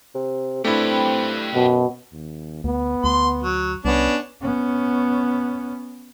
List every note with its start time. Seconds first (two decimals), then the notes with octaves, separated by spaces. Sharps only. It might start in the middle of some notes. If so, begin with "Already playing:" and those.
0.15 C3
0.65 A3 C4 D4 E4 G4 B4
1.54 F#2 B2
2.12 D#2
2.64 D2 B3
3.04 D2 C6
3.42 F#3
3.85 C2 B3 C#4 D4
4.42 B3 C#4